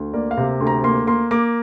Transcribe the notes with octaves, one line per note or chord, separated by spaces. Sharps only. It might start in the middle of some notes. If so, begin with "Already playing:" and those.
Already playing: D2
A#3 D5
F5
C3
D2
A#5
A#3 C6
A#3 C6
A#3 D6